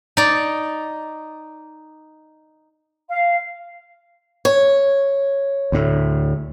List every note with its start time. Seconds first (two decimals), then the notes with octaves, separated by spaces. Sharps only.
0.17 D#4 D5
3.09 F5
4.45 C#5
5.72 D2 A2